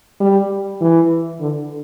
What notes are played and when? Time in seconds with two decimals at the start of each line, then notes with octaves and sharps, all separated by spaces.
0.20 G3
0.81 E3
1.41 D3